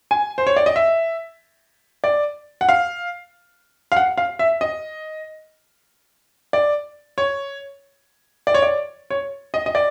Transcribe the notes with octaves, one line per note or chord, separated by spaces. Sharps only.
G#5
C5
C#5
D5
D#5
E5
D5
F#5
F5
F5
F#5
F5
E5
D#5
D5
C#5
D5
C#5
D5
C#5
D#5
D#5
D5